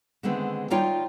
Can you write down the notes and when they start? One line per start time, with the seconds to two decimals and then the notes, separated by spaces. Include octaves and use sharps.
0.23 D3 D#3 G#3 A3 B3 C4
0.70 G3 D#4 F4 C#5 F5 G5